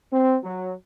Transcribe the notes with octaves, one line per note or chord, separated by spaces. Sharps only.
C4
F#3